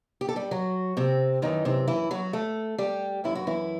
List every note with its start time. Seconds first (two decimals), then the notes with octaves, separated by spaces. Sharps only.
0.21 G4
0.29 A4
0.36 G3 G4
0.51 F#3 F#4
0.97 C3 C4
1.42 F#2 D#3 E3 D#4
1.65 C3 C4
1.87 E3 E4
2.11 F#3 F#4
2.33 A3 A4
2.78 G3 G4
3.24 F#2 E3 E4
3.35 F#4
3.47 E3 E4